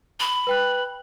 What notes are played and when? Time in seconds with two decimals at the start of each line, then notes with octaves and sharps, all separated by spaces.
0.20 B5
0.47 B4 G5 F#6